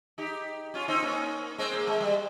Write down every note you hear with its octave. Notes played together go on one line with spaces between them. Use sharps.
D#4 G4
C#4 F4
C4 D#4
A#3 C#4
G#3 C4
A#3
G#3
G3